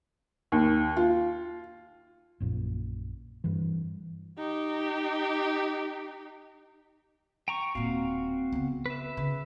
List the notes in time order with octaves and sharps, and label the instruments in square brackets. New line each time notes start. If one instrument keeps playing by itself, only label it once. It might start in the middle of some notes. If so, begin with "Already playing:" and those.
[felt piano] D#2
F4
[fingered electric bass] A#1 F#2 A#2
G2 E3
[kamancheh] D#4 G4
[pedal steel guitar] G5 A#5 C#6
[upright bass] D#1 A#2 [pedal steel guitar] C4 F#4 F5
[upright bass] C#3 B3
[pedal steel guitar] B4 E5
[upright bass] C#3